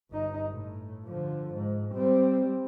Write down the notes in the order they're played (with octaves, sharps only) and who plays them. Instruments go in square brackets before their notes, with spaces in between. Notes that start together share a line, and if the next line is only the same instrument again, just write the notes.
[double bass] G1 D#4
A2
D3 F3
G#2
G3 C4